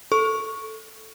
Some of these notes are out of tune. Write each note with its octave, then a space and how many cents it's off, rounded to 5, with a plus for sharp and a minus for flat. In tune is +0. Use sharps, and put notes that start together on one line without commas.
A4 +0 C#6 +0